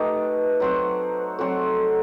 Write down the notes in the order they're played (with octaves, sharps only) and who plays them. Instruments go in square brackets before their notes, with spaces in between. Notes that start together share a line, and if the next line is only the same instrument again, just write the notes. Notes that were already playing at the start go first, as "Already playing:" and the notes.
Already playing: [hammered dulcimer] A3 D#4 G4 [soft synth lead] B4
[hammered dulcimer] F#3 C4 F#4
[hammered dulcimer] F#3 C4 F#4 [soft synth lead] A4